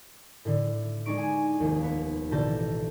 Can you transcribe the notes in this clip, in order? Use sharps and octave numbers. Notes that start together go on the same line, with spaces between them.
A2 D3
G#3 D4 D#4 C#6 D7
G#5
F1 D#2
B3
A1 B2 D3 A5 G6 A#6